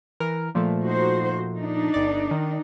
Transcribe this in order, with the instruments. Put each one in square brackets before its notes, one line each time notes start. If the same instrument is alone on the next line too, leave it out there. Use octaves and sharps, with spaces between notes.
[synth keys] E3 A#4
A#2 F3 A3
[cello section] D#4 F#4 C5
D4 D#4
[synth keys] G1 D5
D#3